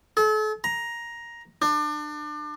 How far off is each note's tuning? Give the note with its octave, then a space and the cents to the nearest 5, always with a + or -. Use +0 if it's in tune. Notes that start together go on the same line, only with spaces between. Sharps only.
A4 -40
A#5 +10
D4 +30